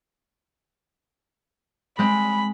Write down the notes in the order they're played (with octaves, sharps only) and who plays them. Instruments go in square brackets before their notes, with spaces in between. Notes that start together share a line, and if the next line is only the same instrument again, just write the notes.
[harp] G#3 C4 [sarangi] B5